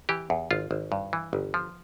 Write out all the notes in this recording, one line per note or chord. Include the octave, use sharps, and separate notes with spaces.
E3 G4
E2
G#1 F4
G#1
G2
E3
G1
F3